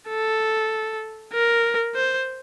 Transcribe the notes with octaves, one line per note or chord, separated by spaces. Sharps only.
A4
A#4
C5